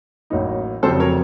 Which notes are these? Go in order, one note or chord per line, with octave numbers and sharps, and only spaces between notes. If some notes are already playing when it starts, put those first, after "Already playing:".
A1 A2 F#3 A#3 D#4
F1 F2 C#3 F#3 C4 A4 C5
A#4 C#5